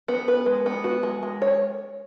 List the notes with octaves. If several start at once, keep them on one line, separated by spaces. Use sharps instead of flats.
B3
B4
G#3
B3
F#4
G#3
G#3
C#5